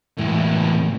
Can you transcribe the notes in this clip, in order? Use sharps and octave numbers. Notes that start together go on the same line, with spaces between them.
C#2 A2 E3